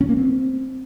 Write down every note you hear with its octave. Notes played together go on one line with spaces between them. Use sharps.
C#4
A#3
C4